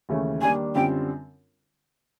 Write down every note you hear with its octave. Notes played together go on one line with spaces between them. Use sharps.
D#2 C#3 E3 A3 C#4
D#3 G3 A#3 D4 G#5
F#2 D3 G3 C4 F4 G5